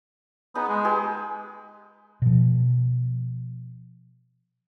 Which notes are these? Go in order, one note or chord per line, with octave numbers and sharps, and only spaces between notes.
B3 D#4 G#4 D#5
G#3
G4 G#4 B4
B2 F3